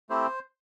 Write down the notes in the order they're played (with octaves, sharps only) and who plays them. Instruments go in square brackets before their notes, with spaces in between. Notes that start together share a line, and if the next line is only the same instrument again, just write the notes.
[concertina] A3 C4 E4 G4 C5